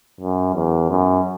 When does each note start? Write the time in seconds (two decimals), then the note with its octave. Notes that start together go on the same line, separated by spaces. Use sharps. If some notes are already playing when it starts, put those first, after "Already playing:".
0.20 F#2
0.55 E2
0.90 F#2